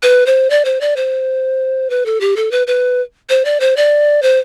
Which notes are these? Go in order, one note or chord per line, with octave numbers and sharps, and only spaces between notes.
B4
C5
D5
C5
D5
C5
B4
A4
G4
A4
B4
B4
C5
D5
C5
D5
C5